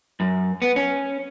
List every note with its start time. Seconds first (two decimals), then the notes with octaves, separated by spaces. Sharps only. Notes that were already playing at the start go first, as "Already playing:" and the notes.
0.20 F#2
0.62 B3
0.76 C#4